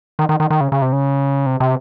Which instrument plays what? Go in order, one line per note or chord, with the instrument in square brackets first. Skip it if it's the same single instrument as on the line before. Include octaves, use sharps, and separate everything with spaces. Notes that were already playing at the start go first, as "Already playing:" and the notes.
[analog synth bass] D#3
D#3
D#3
D#3
C#3
C#3
C3
C#3
C3
C3